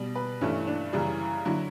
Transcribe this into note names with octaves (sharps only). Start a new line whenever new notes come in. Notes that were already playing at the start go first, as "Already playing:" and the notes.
Already playing: B2 G3
B4
G2 E3 A3 C#4
D4
F#2 C#3 E3 G3
D3 F#3 E4